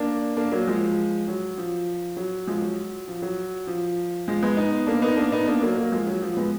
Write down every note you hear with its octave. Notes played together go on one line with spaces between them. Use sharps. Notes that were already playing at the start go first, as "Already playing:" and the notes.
Already playing: A#3 D4
A#3 D4
F#3 A#3
F3 G#3
F#3
F3
F#3
F3 G#3
F#3
F3
F#3
F3
F3 G#3
G#3 B3
B3 D#4
A#3 D4
B3 D#4
A#3 D4
B3 D#4
A#3 D4
F#3 A#3
F#3 A#3
F3 G#3
F#3
F3
G#3 B3